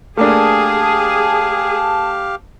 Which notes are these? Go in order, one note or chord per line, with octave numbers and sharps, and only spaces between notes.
A3 A#3 D4 G4 G#4 F5 A5